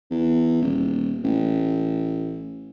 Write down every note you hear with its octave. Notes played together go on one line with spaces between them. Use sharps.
E2
D#1
A1